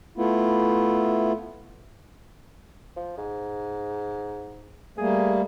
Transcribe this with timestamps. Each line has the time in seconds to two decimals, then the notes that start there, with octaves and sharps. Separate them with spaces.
0.18 A3 B3 E4 F4
2.96 F3
3.18 G#2
4.98 G3 A3 A#3 G#4